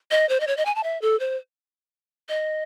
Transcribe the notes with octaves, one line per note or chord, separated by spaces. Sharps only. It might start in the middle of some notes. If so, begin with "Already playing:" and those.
D#5
C5
D#5
C#5
D#5
G#5
A5
E5
A4
C5
D#5